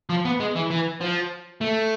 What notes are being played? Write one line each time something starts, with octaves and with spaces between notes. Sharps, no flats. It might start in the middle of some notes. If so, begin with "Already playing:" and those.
F3
B3
G#3
E3
E3
F3
A3